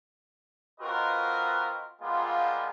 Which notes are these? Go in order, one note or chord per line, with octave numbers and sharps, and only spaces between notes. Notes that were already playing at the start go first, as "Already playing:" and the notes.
C4 F4 F#4 A#4 B4 D#5
G3 G#3 A#3 B3 F4